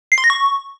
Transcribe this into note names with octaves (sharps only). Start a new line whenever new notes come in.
C7
C6
A#6
C#6